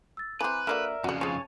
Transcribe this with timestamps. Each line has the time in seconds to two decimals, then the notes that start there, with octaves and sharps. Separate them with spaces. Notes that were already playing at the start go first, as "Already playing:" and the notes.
0.17 E6 A6
0.41 E3 C4 B4 G#5 A#5 D6
0.67 D3 A#3 F#4 A#4 D5 E5 F6
1.04 F2 C#3 F#4 F#5
1.21 F3 G#4 C#5 G#5 A5